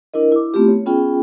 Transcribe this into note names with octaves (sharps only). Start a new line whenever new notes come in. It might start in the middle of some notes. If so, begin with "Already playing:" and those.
D4 E4 A#4 D#5
E4 D6
A3 B3 C4 E4 F4 G4
C#5
B3 C#4 F4 G#4 G5